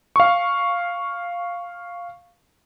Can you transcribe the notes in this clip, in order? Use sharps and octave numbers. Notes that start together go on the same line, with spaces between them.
F5 C#6